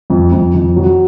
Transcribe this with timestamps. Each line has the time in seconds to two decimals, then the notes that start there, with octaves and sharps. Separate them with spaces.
0.10 F2
0.32 F2
0.54 F2
0.76 F#3